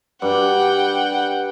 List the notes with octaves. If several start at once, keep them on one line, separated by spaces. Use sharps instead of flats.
G2 F#5 G5